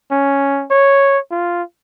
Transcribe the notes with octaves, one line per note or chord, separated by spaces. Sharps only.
C#4
C#5
F4